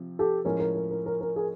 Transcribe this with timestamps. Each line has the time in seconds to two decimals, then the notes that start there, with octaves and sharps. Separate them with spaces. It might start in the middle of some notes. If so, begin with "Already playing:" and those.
Already playing: C3 F3 C4
0.19 G4 A4
0.45 A2 F3 G#3 C#4 A#4
0.60 A#4
0.75 A#4
0.91 A#4
1.06 A#4
1.21 A#4
1.36 G#4 A#4